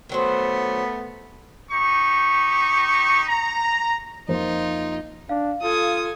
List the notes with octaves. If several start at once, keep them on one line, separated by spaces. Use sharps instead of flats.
D#3 F#3 A3 B3 C5
D#4 G4 C#6
A#5
F2 A#3 D#4 F4 C5
D4 F5
F4 A4 G#5 D#6